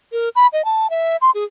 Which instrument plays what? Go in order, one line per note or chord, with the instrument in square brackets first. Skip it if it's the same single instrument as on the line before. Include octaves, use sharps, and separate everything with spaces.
[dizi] A#4
B5
D#5
A5
E5
C6
G#4